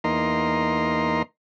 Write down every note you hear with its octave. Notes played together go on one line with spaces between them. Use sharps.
E2 A#3 D#4 A#5 C6